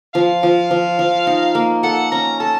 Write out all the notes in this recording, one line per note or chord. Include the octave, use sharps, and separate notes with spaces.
F3 F5
F3
F3
F3
D#4
A#3
A4 F#5
C#4 A#5
A4 A5